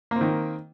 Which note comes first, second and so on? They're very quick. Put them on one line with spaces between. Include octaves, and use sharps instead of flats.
A#3 C4 D#3